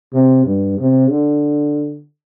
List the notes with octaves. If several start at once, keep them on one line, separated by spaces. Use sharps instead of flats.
C3
G2
C3
D3